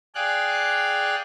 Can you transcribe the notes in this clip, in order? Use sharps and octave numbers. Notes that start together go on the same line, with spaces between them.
G#4 D5 F5 G5 F#6